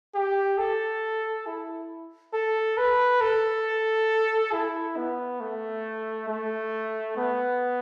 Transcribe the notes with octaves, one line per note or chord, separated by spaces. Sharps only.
G4
A4
E4
A4
B4
A4
E4
B3
A3
A3
B3